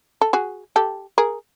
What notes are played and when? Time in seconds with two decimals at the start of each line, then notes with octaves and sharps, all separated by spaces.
0.21 A4
0.33 F#4 G#4
0.76 G4 A4
1.18 G#4 A#4